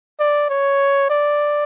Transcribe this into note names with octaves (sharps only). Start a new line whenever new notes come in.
D5
C#5
D5